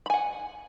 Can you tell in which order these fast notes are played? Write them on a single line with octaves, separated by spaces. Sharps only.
B5 G#5 F#5